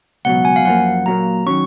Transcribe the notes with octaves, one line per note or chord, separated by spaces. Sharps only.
C#2 B2 F#3 F#5
G#5
F5
F#2 F3 A#3 F#5
A#2 F#3 A#3 A#5
D#3 F#3 C#4 C#6